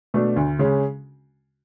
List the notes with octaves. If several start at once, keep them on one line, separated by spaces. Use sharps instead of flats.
B2 A3 D4
D2
C#3 G#3 C#4